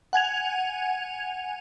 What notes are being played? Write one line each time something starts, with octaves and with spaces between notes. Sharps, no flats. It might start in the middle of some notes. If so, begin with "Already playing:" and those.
F#5 G#5 G#6 F7